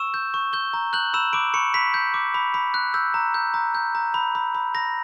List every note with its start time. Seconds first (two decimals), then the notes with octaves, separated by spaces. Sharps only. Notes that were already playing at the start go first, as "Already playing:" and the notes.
Already playing: C#6 E6 E7
0.14 G6
0.34 C#6
0.53 G6 G7
0.73 A#5
0.93 F#6 G6 F#7
1.13 B5 E6 E7
1.33 B5 D6 D7
1.54 B5 C#6 C#7
1.74 B5 B6
1.94 G6
2.14 D6
2.34 B5
2.54 B5
2.74 F#6
2.94 E6 G6
3.14 A#5
3.34 G6
3.54 A#5
3.75 G6
3.95 A#5
4.14 B5
4.35 B5
4.55 B5
4.74 B5 A#6